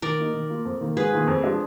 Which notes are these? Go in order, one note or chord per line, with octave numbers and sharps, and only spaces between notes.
D#3 A#4 D5
A#3 D#4
D#3
A#3 F4
F2
D#3 A#3
G#2 G#4 B4
D#3 A#3 F4
F2
F3 G#3 D4